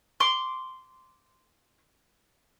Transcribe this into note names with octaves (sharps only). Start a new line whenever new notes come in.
C6 D6